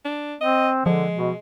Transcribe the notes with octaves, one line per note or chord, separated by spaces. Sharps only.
D4
C4 D#5
D3 F3 G#3
B2